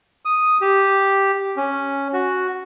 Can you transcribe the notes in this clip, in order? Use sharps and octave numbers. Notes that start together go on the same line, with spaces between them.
D#6
G4
C#4
F#4